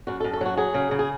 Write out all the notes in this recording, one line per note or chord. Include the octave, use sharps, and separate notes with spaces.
F#2 F#4
A4
F#2
A4
F#3 F#4
F#3 G#4
C#3
C#3
G#4